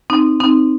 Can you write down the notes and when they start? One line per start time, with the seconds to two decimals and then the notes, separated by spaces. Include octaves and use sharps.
0.10 C4 D#4
0.40 C4 D#4